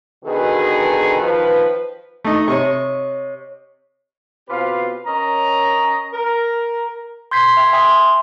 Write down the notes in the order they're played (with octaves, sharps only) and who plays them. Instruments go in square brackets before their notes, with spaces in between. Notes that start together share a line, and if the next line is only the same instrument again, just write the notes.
[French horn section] B2 D3 D#3 G#4 B4
D#3 F3 B4
[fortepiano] A3 D#4
[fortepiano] C3 [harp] C#5 D#5 C#6
[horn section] B2 C4 F4 G4 B4 F5
C#4 A#4 C#5 D#5 A#5
A#4
[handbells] C6 G6 G#6 B6 C7
E5 G5 G#6 B6
E5 G5 G#5 C6 D#6